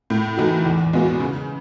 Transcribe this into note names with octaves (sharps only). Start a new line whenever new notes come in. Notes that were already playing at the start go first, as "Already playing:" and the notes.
A2
E3 A3 D#4 F#4
E2
B2 G#3 B3 F#4
C#3